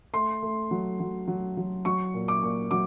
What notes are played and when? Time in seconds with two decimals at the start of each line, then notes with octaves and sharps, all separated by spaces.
0.13 A3 C6
0.42 A3
0.71 F#3
1.00 F#3
1.28 F#3
1.57 F#3
1.85 F#3 C#6
2.14 A#2
2.28 D6
2.43 A#2
2.71 F#3 D6